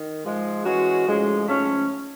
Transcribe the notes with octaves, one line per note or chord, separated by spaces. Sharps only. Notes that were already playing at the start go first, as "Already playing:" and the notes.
Already playing: D#3
G#2 F3 G#3
E3 G#3 C#4 F#4
A2 F3 G#3 C#4
G#2 F3 A3 C#4